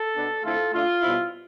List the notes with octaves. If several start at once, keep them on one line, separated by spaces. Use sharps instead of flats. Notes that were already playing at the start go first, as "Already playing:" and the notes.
Already playing: A4
B2 B3 D4
D3 A3 C4 E4 F4 A4
D3 A3 D4 F4
B2 G3 C4 E4